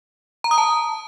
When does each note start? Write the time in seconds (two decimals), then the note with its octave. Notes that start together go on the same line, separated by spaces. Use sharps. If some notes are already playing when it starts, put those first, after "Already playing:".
0.44 A#5
0.51 D#6
0.58 A5